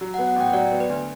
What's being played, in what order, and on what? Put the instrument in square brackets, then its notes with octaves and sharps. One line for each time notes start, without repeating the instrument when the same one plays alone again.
[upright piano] F#3
[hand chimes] F#5
[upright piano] B3
[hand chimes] F#5
[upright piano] A1 [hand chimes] G5
[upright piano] F#3 [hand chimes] D5
[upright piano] B3
[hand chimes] B4
[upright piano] D2